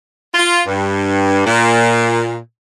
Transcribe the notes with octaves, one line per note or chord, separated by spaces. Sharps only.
F4
G2
A#2